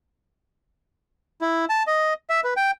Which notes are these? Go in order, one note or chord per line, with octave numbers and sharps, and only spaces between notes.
E4
A5
D#5
E5
B4
G5